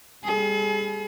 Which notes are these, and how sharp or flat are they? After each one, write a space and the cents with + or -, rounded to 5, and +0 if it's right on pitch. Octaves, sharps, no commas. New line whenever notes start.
G3 +35 G#4 +45